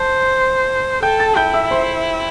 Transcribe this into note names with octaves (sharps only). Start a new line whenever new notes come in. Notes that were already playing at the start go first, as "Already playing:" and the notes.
Already playing: C5 A5
A4 G5 G6
A5 A6
E4 G5 G6
E5 E6
C5 C6